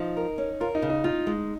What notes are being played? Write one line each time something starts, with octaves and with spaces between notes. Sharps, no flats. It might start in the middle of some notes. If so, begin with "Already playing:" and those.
Already playing: F3 D#4
A#4
C#4
F4 A#4
D#4
C#3
D#4
D#4 F4
G#3